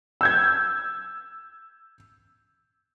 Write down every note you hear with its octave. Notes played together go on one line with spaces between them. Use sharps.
E6 G6 G#6